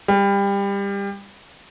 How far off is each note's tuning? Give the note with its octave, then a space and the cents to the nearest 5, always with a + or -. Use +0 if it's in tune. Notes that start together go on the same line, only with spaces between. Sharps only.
G3 +25